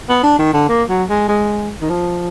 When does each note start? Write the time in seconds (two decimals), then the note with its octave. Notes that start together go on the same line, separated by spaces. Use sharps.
0.09 B3
0.23 D4
0.39 D#3
0.53 D3
0.69 A#3
0.89 F#3
1.10 G#3
1.28 G#3
1.81 D#3
1.90 F3